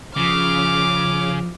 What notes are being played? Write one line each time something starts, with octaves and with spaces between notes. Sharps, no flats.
C#3 F3 D6 F6